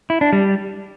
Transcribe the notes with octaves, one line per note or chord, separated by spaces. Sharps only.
E4
D4
G3